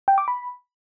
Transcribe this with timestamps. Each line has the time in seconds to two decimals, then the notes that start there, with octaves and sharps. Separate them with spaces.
0.08 G5
0.18 D6
0.28 B5